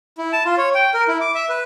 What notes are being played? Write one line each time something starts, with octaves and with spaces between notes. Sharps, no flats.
E4
A5
F4
C#5
G5
A#4
E4
D6
E5
B4